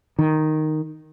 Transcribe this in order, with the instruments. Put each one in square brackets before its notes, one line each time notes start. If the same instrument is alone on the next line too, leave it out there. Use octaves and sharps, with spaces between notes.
[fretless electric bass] D#3